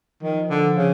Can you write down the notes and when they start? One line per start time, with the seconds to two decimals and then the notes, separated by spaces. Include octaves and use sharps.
0.23 D#3 F3
0.50 D3
0.77 C#3